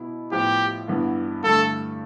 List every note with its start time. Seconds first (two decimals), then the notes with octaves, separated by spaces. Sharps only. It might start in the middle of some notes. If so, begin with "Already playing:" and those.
Already playing: B2 B3 E4
0.32 A2 F3 B3 F4 G4 B4
0.88 G2 E3 B3
1.44 G2 D3 A3 A4